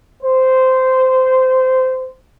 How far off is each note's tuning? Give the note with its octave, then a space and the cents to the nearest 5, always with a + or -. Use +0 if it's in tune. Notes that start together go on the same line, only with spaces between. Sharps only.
C5 -15